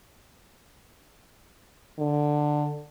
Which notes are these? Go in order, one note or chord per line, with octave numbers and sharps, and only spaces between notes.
D3